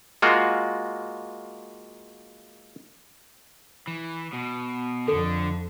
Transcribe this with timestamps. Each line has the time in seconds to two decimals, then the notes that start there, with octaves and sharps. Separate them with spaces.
0.22 G#3 A#3 F4 F#4
3.87 E3
4.33 B2
5.08 F2 D3 A4